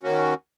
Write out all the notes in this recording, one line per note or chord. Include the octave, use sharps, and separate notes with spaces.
D#2 D#3 A#3 C#4 F#4